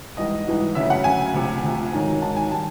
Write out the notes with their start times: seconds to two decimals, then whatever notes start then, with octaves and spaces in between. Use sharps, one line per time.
0.17 G#2 E3 G3 D#5
0.47 G#2 E3 G3
0.75 D2 C#3 F#3 E5
0.90 F#5
1.04 D2 C#3 F#3 G#5
1.34 D2 C3 F3
1.63 D2 C3 F3
1.93 G#2 D#3 F#3
2.22 G#2 D#3 F#3 A5
2.36 G#5
2.51 D#3 G3 A5